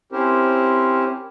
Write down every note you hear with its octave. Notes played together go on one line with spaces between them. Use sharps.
C4 C#4 E4 G4 A#4 C5